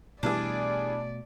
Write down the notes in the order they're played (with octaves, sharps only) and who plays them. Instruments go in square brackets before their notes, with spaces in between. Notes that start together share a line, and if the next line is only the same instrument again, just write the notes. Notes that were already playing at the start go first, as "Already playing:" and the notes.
[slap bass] B2 A3 [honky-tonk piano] E3 G3 G#4 [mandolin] D4 [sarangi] D5